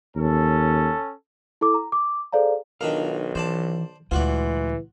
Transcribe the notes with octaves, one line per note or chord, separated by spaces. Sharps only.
D#2 C#4 A4
E4 A4 D6
A#5
D6
G#4 A4 C5 D5 F5 A#5
B1 D#3 D4 F4 A#4 F5
D#3 E3 C5 D5 A5
D2 A#2 E3 G#3 F4 F#4 D5